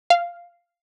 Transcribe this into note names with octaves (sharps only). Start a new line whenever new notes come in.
F5